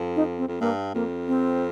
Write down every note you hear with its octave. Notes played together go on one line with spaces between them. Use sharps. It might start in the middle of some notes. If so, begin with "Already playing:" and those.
Already playing: F2
D#4
C4
F2
G2 A#3
F2 A#3
C4